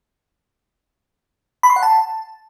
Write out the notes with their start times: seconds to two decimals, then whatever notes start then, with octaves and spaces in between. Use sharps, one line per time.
1.63 B5
1.70 C6
1.76 F#5
1.83 A5